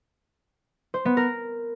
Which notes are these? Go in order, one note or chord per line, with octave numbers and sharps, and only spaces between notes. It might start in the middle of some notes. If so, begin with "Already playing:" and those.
C5
B3
A#4